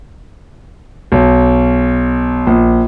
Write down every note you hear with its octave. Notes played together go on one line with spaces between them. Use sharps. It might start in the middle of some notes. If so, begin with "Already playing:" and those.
B1
A#1